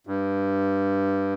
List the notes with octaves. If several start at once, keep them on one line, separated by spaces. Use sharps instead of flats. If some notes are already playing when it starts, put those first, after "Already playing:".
G2